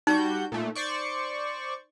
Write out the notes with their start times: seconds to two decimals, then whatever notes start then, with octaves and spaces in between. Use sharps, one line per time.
0.07 G3 D#4 F#4 G6
0.52 A#2 A3
0.75 C5 D5 C#6